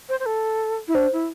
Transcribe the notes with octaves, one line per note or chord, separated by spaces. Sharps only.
C5
C5
A4
E4
D4 C5
E4